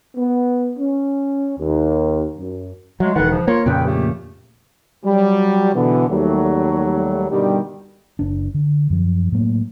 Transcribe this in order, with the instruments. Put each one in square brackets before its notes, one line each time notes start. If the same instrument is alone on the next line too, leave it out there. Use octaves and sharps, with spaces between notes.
[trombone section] B3
C#4
D#2
F#2
[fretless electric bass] F#3 [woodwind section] G#3 A3
[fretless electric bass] E1 D#3 [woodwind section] A4 B4 F#5
[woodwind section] C#3 F3
[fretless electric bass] A#3 [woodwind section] F4 C#5
[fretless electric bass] F2 A#2 C#3 [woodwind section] B4 G5
[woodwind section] A3 A#3 G4
[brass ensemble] F#3 G3
B2 D3 E3 B3
D#2 F#3 G3 A3
G2 B2 D3 D#3 G3
[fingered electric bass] F#1 D4
D3
F#2 F3
A2 F#3 A3 A#3